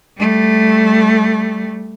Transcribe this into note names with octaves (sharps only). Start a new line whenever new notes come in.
G3 A3